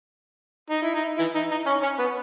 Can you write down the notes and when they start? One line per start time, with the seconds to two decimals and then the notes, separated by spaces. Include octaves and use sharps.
0.70 D#4
0.82 E4
0.94 D#4
1.18 E3 E4
1.35 D#4
1.51 D#4
1.66 C#4 C#5
1.82 C#4 C#5
1.99 B3 B4